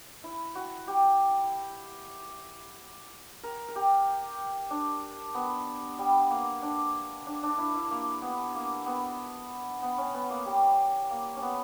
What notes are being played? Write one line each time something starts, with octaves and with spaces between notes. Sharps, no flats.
E4
F#4
G4
A#4
A#4
G4
D4
B3
G3
A#3
D4
D4
D4
E4
E4
A#3
B3
A#3
B3
B3
C#4
B3
A#3
G3
A#3
C#4
B3